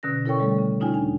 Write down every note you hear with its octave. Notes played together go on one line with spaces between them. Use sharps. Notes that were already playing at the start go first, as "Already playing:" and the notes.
B2 D3 C#4 A#6
E4 A4 A#4 C#5 G5 C#6
D3 G3 A3 A4
C#3
C#4 D#4 F4 G5 G#5
E2 D4 G#5